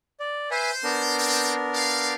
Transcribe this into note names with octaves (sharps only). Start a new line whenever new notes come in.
D5
B4 C5 E5 G#5
B3 D4 A#4
C4
G4 D5 F5